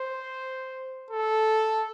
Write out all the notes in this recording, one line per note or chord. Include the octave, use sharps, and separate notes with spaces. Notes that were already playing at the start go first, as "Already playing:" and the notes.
Already playing: C5
A4